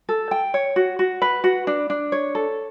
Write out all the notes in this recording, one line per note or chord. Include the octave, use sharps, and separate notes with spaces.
A4
G5
C#5
F#4
F#4
B4
F#4
D4
D4
C#5
A4